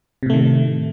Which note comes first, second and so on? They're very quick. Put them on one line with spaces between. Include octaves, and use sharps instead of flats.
C3 A2 A3 D#3